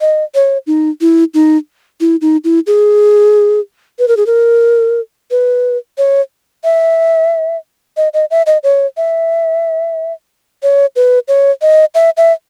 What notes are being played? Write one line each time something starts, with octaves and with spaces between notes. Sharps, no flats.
D#5
C#5
D#4
E4
D#4
E4
D#4
E4
G#4
B4
A#4
G#4
A#4
B4
C#5
E5
D#5
D#5
E5
D#5
C#5
E5
C#5
B4
C#5
D#5
E5
E5